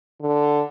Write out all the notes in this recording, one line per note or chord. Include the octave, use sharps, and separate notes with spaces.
D3